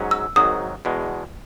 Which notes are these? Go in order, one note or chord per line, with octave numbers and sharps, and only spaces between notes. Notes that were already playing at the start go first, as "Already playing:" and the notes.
Already playing: G#2 F#3 C#4
E6
G#1 G#2 D#3 F#3 D#6
E2 B2 G#3